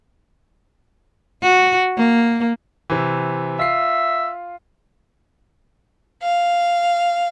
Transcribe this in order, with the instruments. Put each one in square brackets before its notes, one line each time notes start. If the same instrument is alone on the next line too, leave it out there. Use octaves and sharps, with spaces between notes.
[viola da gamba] F#4
A#3
[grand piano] C3 E3
[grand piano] F4 C7 [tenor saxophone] E5
[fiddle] F5